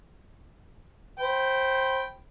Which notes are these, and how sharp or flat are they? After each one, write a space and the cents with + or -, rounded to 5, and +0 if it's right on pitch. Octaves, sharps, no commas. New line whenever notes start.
C5 +20 G5 -10 B5 +0